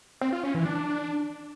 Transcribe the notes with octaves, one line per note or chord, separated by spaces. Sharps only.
C4
F4
C#4
E3
D4